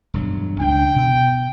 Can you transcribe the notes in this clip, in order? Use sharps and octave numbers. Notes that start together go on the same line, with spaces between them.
E1 G2 F#3
C#2 D4 G5
B2